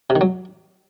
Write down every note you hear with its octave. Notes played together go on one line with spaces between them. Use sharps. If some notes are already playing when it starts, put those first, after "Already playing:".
C3
D#3
F#3